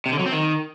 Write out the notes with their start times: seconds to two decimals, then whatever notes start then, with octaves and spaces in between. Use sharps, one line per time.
0.06 C3
0.12 D3
0.19 F#3
0.26 C4
0.32 D#3